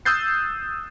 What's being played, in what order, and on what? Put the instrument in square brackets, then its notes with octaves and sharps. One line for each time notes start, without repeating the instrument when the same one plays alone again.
[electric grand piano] D#6 E6 F#6 G6 A6 C7